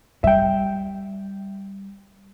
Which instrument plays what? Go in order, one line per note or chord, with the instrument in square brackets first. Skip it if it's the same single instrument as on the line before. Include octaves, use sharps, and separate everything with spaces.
[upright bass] G3 [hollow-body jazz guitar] E5 G5